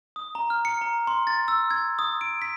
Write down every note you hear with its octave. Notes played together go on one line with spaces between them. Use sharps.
D#6
A#5
F6
C#7
A#5
C6
A6
E6
G#6
D#6
D7
B6